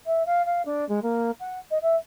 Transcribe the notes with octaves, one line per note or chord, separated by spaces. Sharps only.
E5
F5
F5
D4
G#3
A#3
F#5
D#5
E5